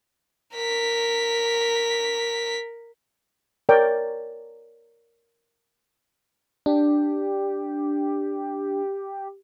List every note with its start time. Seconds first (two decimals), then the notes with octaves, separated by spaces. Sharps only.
0.55 A#4 B6
3.69 A#4 C#5 D5 G5
6.66 D4 G4